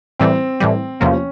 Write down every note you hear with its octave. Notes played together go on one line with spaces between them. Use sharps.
A2 E3 G3 C4
A2 E3 G3
E2 C3 F3 A#3 C#4